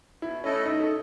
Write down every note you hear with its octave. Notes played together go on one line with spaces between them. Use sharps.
B2 E4
A3 C#4 E4 A4 D#5
B2 D#4
A4